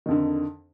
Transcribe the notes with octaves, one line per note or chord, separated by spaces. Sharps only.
F2 D3 D#3